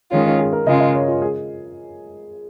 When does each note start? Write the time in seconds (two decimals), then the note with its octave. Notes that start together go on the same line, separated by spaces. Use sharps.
0.11 D#3 G#3 C#4 F4 C#5
0.25 C#5
0.39 G#4
0.53 A#4
0.66 C#3 G#3 F4 D#5
0.80 D#5
0.95 C#5
1.08 F4
1.22 G#4